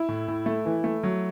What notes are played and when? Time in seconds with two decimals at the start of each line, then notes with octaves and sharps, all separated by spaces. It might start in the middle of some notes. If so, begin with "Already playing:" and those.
Already playing: E4
0.08 A2
0.28 A2
0.46 A3
0.66 E3
0.84 A3
1.03 F#3